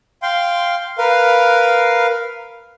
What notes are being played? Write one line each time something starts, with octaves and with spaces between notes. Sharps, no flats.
F5 G5 C6
A#4 B4 F5